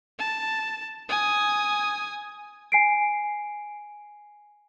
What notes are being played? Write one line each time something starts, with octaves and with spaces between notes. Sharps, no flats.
A5
G#5 D#6
G#5 C7 D7